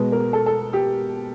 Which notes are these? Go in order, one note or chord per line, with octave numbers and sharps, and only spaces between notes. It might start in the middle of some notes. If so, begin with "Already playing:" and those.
Already playing: B2 G#3 B3
A#4
A4
A4
G4